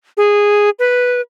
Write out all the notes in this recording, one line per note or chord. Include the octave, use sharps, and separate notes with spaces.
G#4
B4